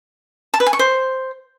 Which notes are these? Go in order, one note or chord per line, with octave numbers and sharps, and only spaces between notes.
A5
B4
G#5
C#6
C5